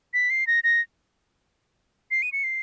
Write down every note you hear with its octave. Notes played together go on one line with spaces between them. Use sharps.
B6
C7
A#6
A#6
C7
D#7
C#7
C7